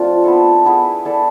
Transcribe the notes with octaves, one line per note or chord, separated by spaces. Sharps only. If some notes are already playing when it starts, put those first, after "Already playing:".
Already playing: F3 A3 C4 D4 F4
B3 E4 A4
B3 E4 G#4
E4 A4 D5